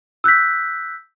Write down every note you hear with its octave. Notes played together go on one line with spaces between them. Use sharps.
E6 F#6 G6 B6